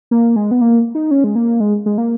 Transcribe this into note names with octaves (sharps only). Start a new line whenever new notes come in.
A#3
G#3
B3
A#3
D#4
C#4
G#3
A#3
G#3
G#3
A#3